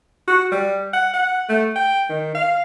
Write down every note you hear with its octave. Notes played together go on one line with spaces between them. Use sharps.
F#4
G3
F#5
F#5
A3
G5
D#3
F5